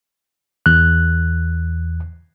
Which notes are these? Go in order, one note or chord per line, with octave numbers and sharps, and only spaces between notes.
E2 F#6